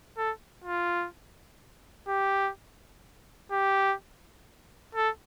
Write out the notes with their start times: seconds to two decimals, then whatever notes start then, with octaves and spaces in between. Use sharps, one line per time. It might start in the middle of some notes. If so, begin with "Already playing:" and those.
0.17 A4
0.64 F4
2.08 G4
3.51 G4
4.95 A4